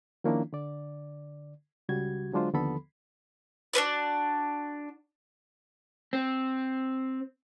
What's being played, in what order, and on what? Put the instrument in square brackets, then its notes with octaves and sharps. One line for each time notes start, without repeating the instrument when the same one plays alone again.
[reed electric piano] D#3 F3 A#3 C#4 D4 E4
D3 D5
C#2 C#3 G3 F#4 G#6
D3 F#3 G#3 D4 F4 C5
D#2 D3 F3 B3 A4 B5
[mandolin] D4 F#4 B4 D5
[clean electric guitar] C4